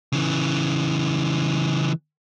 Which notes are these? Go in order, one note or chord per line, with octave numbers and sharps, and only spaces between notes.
C#3 E3